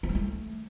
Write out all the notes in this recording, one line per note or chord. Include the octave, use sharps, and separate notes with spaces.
C4
G3
A3